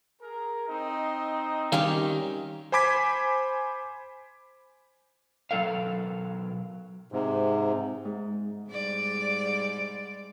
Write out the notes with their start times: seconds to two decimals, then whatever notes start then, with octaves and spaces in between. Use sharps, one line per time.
0.20 G#4 A#4
0.68 C4 D#4 D#5
1.72 D#3 G3 C#4 G4 F5
2.72 C5 G#5 B5 D6 G#6 B6
5.51 B2 F#3 C4 A4 A#4 F5
7.12 G#2 C3
8.05 G#2
8.69 G#2 G3 D5